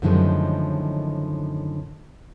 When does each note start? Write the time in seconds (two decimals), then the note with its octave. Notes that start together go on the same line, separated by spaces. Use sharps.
0.02 F#2 A2 D3 D#3 F3 G#3